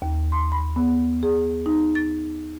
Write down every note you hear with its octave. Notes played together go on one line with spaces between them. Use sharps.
D#2
C6
B5
B3
G#4
D#4
A6